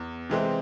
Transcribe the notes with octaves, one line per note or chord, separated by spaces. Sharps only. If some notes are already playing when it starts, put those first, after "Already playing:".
Already playing: E2
C3 E3 G#3 C4